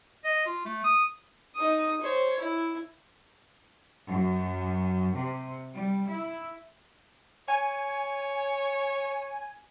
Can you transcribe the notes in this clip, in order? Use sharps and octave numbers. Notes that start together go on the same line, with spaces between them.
D#5
F4
A3
D#6
D#4 D#6
C5 C#5
E4
F#2
C3
G3
E4
C#5 G#5